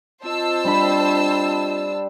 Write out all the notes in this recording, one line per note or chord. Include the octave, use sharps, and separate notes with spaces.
C4 F4 C5 D#5 A5 E6
G3 D4 B5